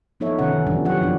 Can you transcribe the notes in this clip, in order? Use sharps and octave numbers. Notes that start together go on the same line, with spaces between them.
F3 B3 D#4 A4 C#5 E5
C3 D#3 C#4 A4 F#5
E3
F3 G3 B3 D4
F#3 G4 C#5 F#5
E3 F3 D4